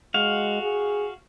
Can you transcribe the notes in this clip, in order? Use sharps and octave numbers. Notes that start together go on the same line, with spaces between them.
G#3 F#4 F5
G#4